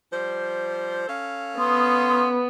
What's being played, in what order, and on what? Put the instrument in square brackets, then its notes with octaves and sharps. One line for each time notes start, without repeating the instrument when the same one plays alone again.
[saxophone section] F3 G3 C5
C#4 A4 F5
[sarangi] B3 [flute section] C6 D#6